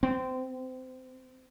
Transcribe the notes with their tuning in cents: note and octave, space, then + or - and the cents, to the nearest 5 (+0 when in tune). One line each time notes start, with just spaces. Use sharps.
C4 -25